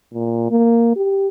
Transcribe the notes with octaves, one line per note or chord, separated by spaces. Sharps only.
A#2
A#3
G4